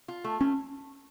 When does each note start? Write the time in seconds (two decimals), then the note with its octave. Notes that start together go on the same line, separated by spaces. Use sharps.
0.08 F4
0.24 A3
0.40 A3 C#4